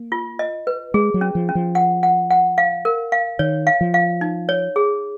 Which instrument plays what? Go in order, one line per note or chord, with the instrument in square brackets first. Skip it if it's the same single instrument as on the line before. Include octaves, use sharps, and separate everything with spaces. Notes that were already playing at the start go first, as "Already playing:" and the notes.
Already playing: [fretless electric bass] A#3
[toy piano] F4
D#5
B4
[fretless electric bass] G#3 [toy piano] G#4
[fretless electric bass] F#3
[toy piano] C#4
[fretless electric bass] F3
[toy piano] C#4
[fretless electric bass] F3
[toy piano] F#5
F#5
F#5
F5
A#4
F5
[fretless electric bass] D#3 [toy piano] C#5
[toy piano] F5
[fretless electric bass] F3
[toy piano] F5
D#4
C#5
G#4